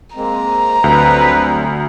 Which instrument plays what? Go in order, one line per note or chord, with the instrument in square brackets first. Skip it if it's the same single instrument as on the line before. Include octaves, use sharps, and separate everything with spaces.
[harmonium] G#3 A#3 C4 [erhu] A#5
[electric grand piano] D2 [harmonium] F#3 G3 C4 [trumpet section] B4